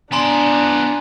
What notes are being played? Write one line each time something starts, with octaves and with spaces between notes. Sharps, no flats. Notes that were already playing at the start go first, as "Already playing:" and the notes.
B3 D4 D5 G#5 A#5 C6